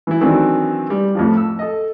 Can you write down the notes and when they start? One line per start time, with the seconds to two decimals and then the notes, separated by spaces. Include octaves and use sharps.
0.07 E3 E4
0.21 D#3 E3 F#3 C4 D4
0.90 G3
1.15 F2 A2 F3
1.37 E6
1.59 A4 D#5